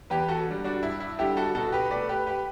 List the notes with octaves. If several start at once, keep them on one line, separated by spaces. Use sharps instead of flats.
E2 G4 B4
F#4 A4
D3 G3
D4 F#4
G2 E4
E4
D3 G3 E4 G4
F#4 A4
B2 F#4 A4
G4 B4
A3 B4 D5
G4 B4
G4 B4